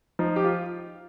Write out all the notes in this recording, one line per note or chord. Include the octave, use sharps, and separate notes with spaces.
F3 D#4
G4
F4